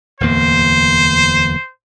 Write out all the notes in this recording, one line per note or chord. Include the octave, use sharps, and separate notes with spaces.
D1 E2 A#3 C5